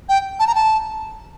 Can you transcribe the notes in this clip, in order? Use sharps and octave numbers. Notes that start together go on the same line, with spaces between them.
G5
A5
A#5
A5